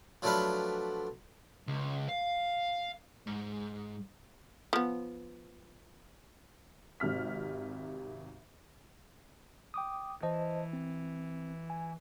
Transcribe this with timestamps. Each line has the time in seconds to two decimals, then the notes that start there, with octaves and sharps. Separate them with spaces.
0.22 F3 F#3 A3 D4 B4 F5
1.68 C#2
2.09 F5
3.27 G#2
4.73 F3 B3
7.00 G#1 C3 F6 B6
9.74 G5 D6 D#6
10.23 E3 C5 D#5 A5
10.73 C4
11.70 G#5